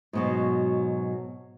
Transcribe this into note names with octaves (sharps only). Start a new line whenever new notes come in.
G#2 B2 F#3